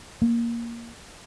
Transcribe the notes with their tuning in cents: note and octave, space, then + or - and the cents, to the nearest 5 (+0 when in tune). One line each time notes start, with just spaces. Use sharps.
A#3 +5